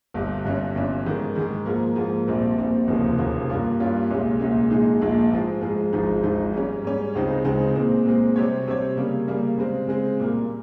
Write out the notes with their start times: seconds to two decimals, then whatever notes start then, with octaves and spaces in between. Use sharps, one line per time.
0.14 G1 G2 G3
0.45 G1 G2 G3 C#4
0.75 G1 G2 G3 C#4
1.06 G#2 D#3 G#3
1.35 G#2 D#3 G#3
1.66 G#2 F3 A#3
1.96 G#2 F3 A#3
2.27 A#1 A#2 G3 C4
2.58 A#1 A#2 G3 C4
2.87 F1 D#2 C#3 F3 A#3
3.18 F1 D#2 C#3 F3 A#3
3.48 G2 G3 A#3 C#4 F4
3.80 G2 G3 A#3 C#4 F4
4.10 C2 A#2 G#3 C#4
4.40 C2 A#2 G#3 C#4
4.70 A#1 A#2 G#3 D#4 G#4
5.01 A#1 A#2 G#3 D#4 G#4
5.31 G#2 F3 G#3
5.62 G#2 F3 G#3
5.93 G#1 G#2 F3 G#3 D#4
6.23 G#1 G#2 F3 G#3 D#4
6.53 G#2 G3 C#4
6.84 G#2 G3 C#4
7.15 C#2 C#3 G#3 C4 D#4
7.44 C#2 C#3 G#3 C4 D#4
7.75 A#2 G#3 C4
8.06 A#2 G#3 C4
8.36 C3 G3 C4 G4 C#5
8.67 C3 G3 C4 G4 C#5
8.97 C#3 G3 A#3
9.28 C#3 G3 A#3
9.58 C#3 G#3 C4
9.88 C#3 G#3 C4
10.19 A#2 G3 A#3